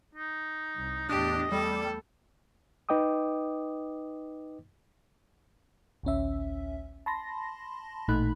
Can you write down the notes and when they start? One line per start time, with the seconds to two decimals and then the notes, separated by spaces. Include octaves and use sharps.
0.15 D#4
0.76 C2
1.09 E2 A2 D4 G4 D#5
1.52 E2 G3 A3 A4
2.89 D#4 B4 D#5 G5 D6 D#6
6.03 A1 D2 C#4 E5
7.06 A5 B5 C6 A#6
8.08 A1 A#2 A3 D#4 B5 F#6